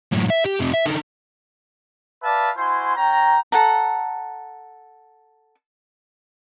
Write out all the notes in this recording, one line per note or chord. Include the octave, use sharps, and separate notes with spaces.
F#2 A2
E5
G4
F2 C3
E5
D3 D#4
B4 D5 E5 F5 A5
E4 F#4 C5 G#5 C6
C#4 G5 A#5
A4 F#5 A#5